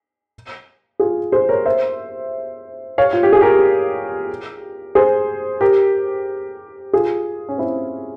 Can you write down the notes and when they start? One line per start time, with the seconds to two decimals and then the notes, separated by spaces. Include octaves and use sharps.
1.00 F4 G#4
1.32 G#4 C5
1.49 A#4 C#5
1.65 C5 E5
2.98 C#5 F5
3.13 F4
3.23 G4
3.33 G#4
3.41 G4 A#4
4.95 G#4 C5
5.61 G4 A#4
6.93 F4 G#4
7.49 C#4
7.58 C4 E4